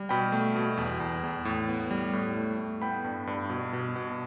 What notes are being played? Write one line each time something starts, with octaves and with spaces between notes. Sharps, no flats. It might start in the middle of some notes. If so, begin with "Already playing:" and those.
Already playing: G3
B2 G5 B5
A3
B2
E2
E2
E2
A2
B3
G3
A2
A3
A2
B3 G5 B5
G2
G2
B2
B2
B2